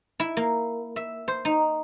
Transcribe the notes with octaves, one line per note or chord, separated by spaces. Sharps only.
E4
A#3
E5
C5
D#4